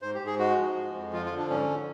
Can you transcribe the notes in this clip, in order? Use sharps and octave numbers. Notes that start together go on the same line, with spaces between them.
G#2 C5
G4
G#2
G#4
G#3 F#4
F3
G#3
F2
F3 F4
F4
D3
D4
G#2 C#4